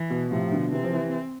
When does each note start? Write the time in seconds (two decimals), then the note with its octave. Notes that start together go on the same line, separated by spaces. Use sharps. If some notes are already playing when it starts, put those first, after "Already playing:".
Already playing: E3
0.10 B2
0.31 A2 C3 F3
0.52 B2 D3
0.72 C3 E3 C4
0.84 F3
0.93 C3 E3